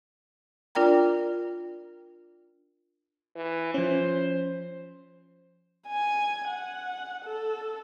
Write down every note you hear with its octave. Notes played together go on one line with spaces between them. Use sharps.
D4 F4 A#4 D5 G5 A#5
E3
F3 C#4 C5
G#5
F#5
A4